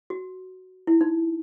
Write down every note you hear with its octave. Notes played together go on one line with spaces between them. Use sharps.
F#4
E4
D#4